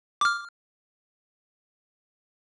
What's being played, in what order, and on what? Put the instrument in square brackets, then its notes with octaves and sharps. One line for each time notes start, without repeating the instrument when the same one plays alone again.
[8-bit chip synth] D6 F6